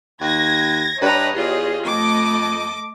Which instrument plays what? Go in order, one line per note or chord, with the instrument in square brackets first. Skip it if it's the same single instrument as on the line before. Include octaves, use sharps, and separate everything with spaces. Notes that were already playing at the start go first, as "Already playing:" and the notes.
[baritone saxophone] D#2 [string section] G#6 A#6
[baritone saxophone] G2 [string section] G4 C#5 D#5 [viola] B4 A#5
[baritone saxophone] E2 [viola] F4 G#4
[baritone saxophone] F2 [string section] A3 A4 D#5 [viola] D6